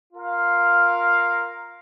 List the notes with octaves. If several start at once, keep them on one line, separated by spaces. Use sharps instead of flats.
F4 A#4 F5